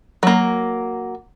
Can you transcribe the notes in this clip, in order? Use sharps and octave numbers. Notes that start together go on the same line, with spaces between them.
F#3 A#3